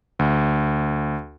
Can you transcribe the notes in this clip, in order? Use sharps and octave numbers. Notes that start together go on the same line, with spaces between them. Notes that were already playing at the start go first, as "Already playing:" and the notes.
D2